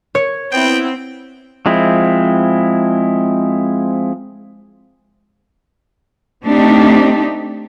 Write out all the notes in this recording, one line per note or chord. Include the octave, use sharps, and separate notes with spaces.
C#5
B3 C4 E4 G5
F3 G#3 C4 E4
A3 C4 D4 D#4 G4